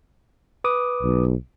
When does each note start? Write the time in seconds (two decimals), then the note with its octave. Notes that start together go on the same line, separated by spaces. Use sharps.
0.64 B4 D6 D#6
1.03 B1